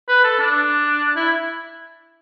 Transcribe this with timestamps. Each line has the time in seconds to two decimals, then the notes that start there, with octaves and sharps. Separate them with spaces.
0.08 B4
0.24 A4
0.39 D4
1.16 E4